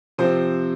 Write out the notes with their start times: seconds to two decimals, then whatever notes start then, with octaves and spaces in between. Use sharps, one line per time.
0.18 C3 F3 C4 C5